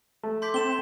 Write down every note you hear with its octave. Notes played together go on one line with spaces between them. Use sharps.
A3
C6 D6 G6 B6
C4 A4 E7 G7